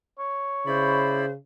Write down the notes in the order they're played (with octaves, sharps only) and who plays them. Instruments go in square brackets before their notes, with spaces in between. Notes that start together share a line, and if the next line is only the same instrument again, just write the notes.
[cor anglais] C#5
[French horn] C#3 [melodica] E4 D5 B5 [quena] C5